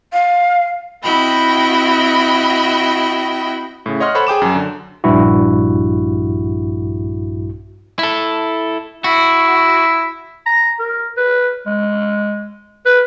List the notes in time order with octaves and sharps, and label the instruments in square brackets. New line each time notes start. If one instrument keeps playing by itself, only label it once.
[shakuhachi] F5
[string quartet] C4 E4 F#4 D#5 G5 B5
[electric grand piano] A2 C#3
C#5 D#5 F#5 C6 F6
A4 C5 C#5 F#5 B5
G#4 G5 D6 E7
F#2 F#3
D3
[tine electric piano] A#1 G2 E4 F#4
[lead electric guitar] E4 A4
[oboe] E4 [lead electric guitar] F#4
[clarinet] A#5
A#4
B4
G#3
B4